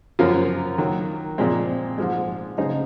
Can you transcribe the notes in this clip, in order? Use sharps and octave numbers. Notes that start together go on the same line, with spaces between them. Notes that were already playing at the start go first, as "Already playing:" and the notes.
F#2 F3 A#3 C#4 F4
D#3 F#3 A#3
A#2 F3 G#3 C4
G#2 F3 G#3
C#3 G#3 D#4 G#4 C5